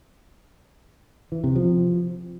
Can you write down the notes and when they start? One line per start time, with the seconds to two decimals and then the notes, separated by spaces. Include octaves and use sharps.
1.32 E3
1.44 C3
1.55 F3